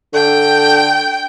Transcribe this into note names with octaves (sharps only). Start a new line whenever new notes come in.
D3 G5